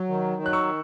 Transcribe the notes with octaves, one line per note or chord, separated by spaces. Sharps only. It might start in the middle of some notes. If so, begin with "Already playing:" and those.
Already playing: F#3
D#3
F#3 F#6
C#6 E6